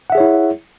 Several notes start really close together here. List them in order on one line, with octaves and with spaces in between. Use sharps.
F#5 E5 G#4 C#5 E4